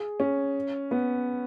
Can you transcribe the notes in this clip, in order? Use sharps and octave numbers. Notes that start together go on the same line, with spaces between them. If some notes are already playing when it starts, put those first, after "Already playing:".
Already playing: G#4
C#4
B3